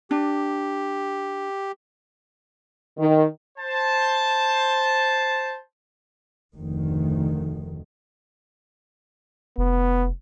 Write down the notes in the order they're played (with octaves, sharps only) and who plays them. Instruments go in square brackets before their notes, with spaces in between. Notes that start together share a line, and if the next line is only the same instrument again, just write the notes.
[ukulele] D4 [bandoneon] G4
[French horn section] D#3
[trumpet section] C5 A5
[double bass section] F1 D2 D#3
[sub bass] F1 [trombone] B3